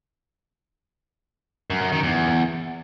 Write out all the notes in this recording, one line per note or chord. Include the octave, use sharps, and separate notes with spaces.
F#2
F#2
D#3
E2